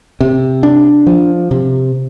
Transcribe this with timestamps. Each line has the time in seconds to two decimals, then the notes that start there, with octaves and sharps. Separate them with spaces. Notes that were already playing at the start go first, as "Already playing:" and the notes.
0.20 C3
0.63 D4
1.07 F3
1.51 C3